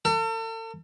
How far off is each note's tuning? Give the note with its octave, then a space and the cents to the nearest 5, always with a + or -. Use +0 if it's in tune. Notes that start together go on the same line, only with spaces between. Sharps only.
A4 +40